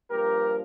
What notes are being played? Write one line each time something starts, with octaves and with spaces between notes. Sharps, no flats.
G2 F3 A#3 G4 A#4